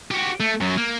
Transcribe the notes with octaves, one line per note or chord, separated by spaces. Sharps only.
F#4 G4
A3
F#2 F#3
A#3